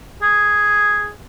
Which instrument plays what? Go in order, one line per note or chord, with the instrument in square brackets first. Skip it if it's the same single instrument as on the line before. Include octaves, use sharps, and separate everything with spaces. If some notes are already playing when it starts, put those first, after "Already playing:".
[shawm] G#4